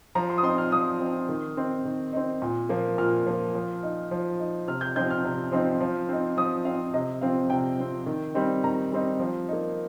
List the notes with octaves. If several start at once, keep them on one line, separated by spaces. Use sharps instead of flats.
F3 A#5
C6
D#6
C4 D#4 C6
F6
F3 D#6
C4 D#4
D#3
C4 D#4
D#3
C4 D#4
A#2
F3 A#3
A#2 F6
F3 A#3
F3
D#4
F3
D#4
C3 F6
G6
F3 C4 D#4 G6
F6
C3
F3 C4 D#4
F3
C4 D#4
F3 D#6
C4 D#4 F5
C3 D#5
F3 C4 F5
C3 G5
F3 C4
D#3
G3 C4 D#4
D#3 A#5
G3 C4 D#4
F3
A#3 D#4